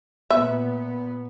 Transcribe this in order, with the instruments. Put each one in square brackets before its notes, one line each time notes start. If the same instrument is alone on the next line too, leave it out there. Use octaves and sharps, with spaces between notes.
[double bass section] A#2 B3 [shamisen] E5